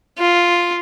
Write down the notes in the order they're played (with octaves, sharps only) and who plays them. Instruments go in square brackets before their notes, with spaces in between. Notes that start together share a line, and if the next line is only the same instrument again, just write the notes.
[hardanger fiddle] F4